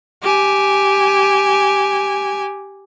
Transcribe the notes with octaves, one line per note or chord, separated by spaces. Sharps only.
G4 G#5